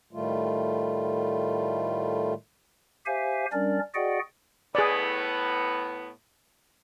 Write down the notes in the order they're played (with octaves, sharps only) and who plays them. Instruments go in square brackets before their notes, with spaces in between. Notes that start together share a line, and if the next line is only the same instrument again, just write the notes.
[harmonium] A2 D#3 G3 A3 F4
[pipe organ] G4 C5 E5 F5 G#5
G3 C#4 D4 A#4 D5
F#4 G#4 D5 D#5 F#5 G5
[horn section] A2 B3 [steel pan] G#4 D5